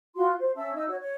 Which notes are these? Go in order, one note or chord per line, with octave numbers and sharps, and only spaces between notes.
F4 F#4 C6
C5
C#4 E5 A5 E6
D#4 E6
F#4 C#5
C#5